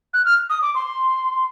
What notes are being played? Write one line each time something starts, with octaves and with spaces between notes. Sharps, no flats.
F#6
F6
D#6
D6
C6